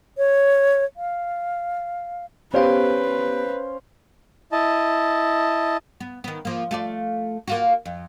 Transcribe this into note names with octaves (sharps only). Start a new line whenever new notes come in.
C#5
F5
B3 C#4 G4 B4 C5 F5
E4 D#5 A5
B3
D#3 B3
F3 A#3
A3 F4 D5
A#3 F4 F#4
F2